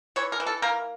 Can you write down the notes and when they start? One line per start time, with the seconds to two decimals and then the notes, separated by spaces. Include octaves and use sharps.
0.16 E3 C#5
0.32 A#4
0.40 E3
0.46 A4
0.62 A#3 A#4